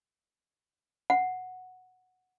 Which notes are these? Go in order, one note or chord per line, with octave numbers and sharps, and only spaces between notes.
F#5